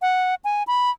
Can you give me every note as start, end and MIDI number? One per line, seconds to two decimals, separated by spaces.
0.02 0.35 78
0.44 0.63 80
0.67 0.90 83